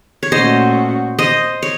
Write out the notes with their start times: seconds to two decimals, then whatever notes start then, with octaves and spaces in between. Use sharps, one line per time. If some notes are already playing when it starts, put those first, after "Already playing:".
0.23 C#5
0.31 A#2 A3 C#4 F#4 C5 D#5
1.19 C5 D#5
1.63 C#5